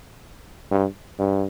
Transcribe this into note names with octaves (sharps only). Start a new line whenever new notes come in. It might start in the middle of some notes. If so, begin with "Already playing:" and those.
G2
G2